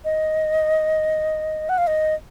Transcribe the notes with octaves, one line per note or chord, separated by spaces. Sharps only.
D#5
F#5
F5
D#5